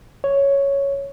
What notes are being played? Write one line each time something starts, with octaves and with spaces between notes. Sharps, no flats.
C#5